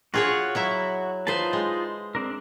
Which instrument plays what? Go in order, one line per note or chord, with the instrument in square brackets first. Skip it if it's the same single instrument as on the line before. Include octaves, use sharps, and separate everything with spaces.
[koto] F4 G#4 C#5 [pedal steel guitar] F#4
[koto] F#3 E4 E5
[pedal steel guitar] D#4 F4 A5 [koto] B4 C5
[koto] G#3
[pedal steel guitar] C4 D4 A#4